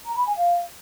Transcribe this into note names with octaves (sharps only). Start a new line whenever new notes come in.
A#5
B5
G#5
F5